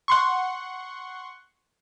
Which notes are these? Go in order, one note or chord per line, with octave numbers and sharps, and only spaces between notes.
F#5 C6 C#6